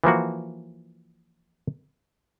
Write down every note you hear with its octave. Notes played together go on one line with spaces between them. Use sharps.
E3 F3 A#3 F#4